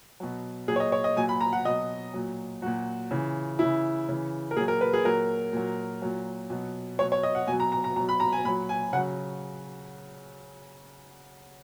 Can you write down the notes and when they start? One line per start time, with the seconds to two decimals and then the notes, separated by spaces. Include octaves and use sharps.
0.20 B2 F#3
0.68 A#2 F#3 G#4
0.76 C#5
0.80 D#5
0.92 C#5
1.04 D#5
1.16 A#2 F#3 G#5
1.29 B5
1.41 A#5
1.53 F#5
1.65 B2 F#3 D#5
2.14 A#2 F#3
2.62 A#2 F#3 F#4
3.11 C#3 E3
3.59 C#3 E3 E4
4.09 C#3 E3
4.51 A#4
4.56 A#2 G#4
4.60 F#3
4.68 A#4
4.81 B4
4.93 G#4
5.05 A#2 F#3 A#4
5.53 A#2 F#3
6.02 A#2 F#3
6.50 B2 F#3
6.99 B2 F#3 C#5
7.12 C#5
7.23 D#5
7.35 F#5
7.47 B2 G#5
7.52 F#3
7.60 A#5
7.72 A#5
7.84 A#5
7.96 B2 A#5
8.00 F#3
8.09 B5
8.20 A#5
8.32 G#5
8.44 A#2 B5
8.48 F#3
8.69 G#5
8.93 C#3 F#5
8.97 F#3